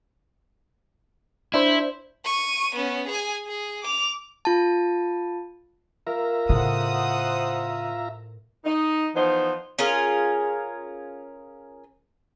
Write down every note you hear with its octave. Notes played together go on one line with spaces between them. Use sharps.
D4 E4 C5
C#6 D#7
B3 C#4
G#4 G#5
G#4
D6 F7
F4 A5
F4 A#4 E5 A#5
A2 C#3 C5 F#5 D#6
D#4
E3 F3 B3 D#4 C5
C#4 F4 G#4 A#4